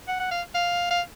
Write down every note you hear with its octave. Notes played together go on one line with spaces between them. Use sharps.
F#5
F#5
F5
F5
F5